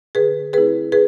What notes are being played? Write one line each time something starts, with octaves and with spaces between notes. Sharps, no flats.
D3 G#4 B4
A3 C4 E4 G#4 B4
G#4 B4